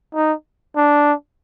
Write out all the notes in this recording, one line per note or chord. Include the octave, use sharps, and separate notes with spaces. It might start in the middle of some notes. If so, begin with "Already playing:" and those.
D#4
D4